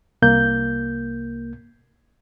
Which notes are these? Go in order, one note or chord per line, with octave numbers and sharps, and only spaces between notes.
C2 A#3 G6